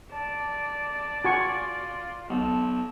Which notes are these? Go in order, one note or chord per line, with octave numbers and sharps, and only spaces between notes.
D5 A5
F4 F#4 G#5 C#6
B1 A5